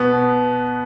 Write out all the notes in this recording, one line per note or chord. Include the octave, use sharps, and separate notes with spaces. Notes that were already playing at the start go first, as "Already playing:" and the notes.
Already playing: B2 B3
B2